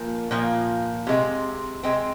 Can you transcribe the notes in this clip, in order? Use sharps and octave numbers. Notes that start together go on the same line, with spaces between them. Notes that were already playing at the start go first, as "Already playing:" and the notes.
Already playing: A#2 F3 A#3
A#2 F3 A#3
C3 G#3 C4
C3 G#3 C4